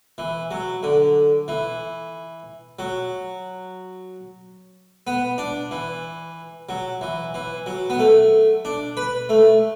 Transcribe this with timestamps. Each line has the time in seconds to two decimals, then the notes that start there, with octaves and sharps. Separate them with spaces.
0.18 E3
0.51 F#3
0.83 D3
1.48 E3
2.79 F#3
5.07 B3
5.38 D4
5.71 E3
6.69 F#3
7.01 E3
7.34 E3
7.66 F#3
7.90 B3
7.99 A3
8.65 D4
8.97 B4
9.29 A3